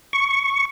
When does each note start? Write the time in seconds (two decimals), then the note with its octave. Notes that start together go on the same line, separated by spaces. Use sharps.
0.13 C#6